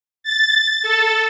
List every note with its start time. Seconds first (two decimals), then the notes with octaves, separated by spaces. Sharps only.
0.23 A6
0.83 A4